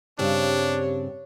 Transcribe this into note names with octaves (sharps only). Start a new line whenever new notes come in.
G2 C#3 C4 D4 G4 C#5